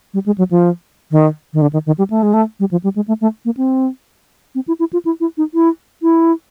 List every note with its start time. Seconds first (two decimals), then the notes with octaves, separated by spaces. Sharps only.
0.14 G3
0.26 G#3
0.38 F#3
0.51 F3
1.11 D#3
1.53 D#3
1.62 D3
1.73 D#3
1.86 D#3
1.98 G3
2.10 A3
2.23 G#3
2.34 A3
2.60 G3
2.71 F3
2.84 G3
2.96 G#3
3.08 A3
3.21 A3
3.45 A#3
3.57 C4
4.55 C4
4.68 E4
4.79 E4
4.93 F4
5.05 E4
5.20 E4
5.38 D#4
5.54 E4
6.02 E4